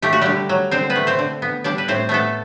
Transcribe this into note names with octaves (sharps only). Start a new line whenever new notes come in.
A3 G4
F#4
D3 G3 G4
F#3
D3 C4 C5
B3 B4
A3
C4 C5
D3
B3
G3 D4 D5
B4
A2 C4 C5
A3 B3 A4